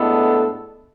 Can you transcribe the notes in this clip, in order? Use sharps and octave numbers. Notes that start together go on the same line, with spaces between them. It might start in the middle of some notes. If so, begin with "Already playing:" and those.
Already playing: A2 G#3 B3 D4 A4